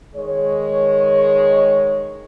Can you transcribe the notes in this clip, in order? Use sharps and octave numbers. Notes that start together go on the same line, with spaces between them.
D#3 G#3 C#5